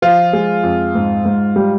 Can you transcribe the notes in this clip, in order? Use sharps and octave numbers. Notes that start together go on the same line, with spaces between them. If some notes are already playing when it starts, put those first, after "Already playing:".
F3 F4
G#3
F2
G#2
G#2
G3